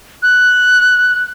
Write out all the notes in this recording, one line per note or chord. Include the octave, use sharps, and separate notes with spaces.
F#6